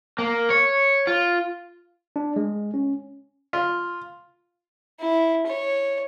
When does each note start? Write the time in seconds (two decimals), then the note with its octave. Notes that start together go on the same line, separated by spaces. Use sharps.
0.19 A#3
0.50 C#5
1.07 F4
2.16 D4
2.36 G#3
2.74 C#4
3.53 F4
5.01 E4
5.47 C#5